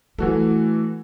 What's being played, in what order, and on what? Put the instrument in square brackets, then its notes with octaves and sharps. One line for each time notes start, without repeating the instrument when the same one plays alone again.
[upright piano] E3 F#4 A4 [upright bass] A3